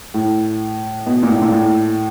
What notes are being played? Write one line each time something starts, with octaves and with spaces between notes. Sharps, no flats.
A2
B2
A#2
A2
A#2
A2